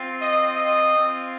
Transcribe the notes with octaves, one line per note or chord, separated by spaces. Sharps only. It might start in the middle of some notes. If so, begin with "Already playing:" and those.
Already playing: C4 F4
D#5
D#5
C4 F4